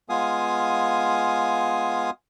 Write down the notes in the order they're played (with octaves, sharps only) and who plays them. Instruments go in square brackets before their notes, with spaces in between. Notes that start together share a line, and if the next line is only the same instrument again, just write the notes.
[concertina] G#3 B3 F4 F5 G#5 D#6